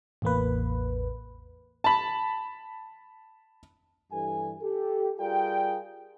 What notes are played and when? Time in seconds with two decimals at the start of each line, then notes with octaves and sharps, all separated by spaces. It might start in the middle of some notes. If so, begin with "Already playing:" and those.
0.22 A1 E2 A#3 B4
1.84 A5 B5
4.12 G2 E3 A4 G#5
4.62 G4 A4
5.19 G3 F4 G#4 A#4 D5 G5